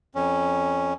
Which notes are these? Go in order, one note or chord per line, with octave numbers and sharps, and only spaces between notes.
F2 C#4